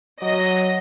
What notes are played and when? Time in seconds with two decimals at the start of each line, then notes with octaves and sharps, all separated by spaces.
0.22 F#3 D#5